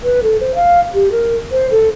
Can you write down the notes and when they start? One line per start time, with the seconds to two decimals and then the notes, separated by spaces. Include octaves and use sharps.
0.03 B4
0.23 A4
0.40 C5
0.55 F5
0.94 G4
1.12 A#4
1.51 C5
1.71 A4